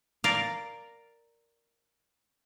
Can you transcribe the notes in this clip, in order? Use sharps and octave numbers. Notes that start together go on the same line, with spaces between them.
A#4 D5 F5